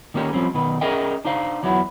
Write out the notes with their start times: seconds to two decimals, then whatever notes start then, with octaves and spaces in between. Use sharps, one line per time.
0.14 D#3 A#3 C#4 G4
0.33 F3 G3 C4 C#4
0.54 B2 D#3 B4
0.81 C#4 G#4 A#4 D#5 E5 G5
1.25 D4 D#4 C5 F5
1.63 E2 F#3 B3 E4